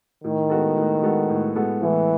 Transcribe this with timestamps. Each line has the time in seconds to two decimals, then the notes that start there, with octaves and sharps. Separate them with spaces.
0.24 A2 D#3
0.50 G#3 B3 F#4 A4
0.77 A2
1.02 G#3 B3 F#4 A4
1.30 A2
1.55 G#3 B3 F#4 A4
1.82 A2 E3